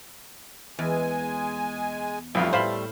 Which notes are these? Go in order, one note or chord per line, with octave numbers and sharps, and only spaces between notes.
E2 G#3 G#5
B1 F2 G3 A3 F4
A2 C5 F5 B5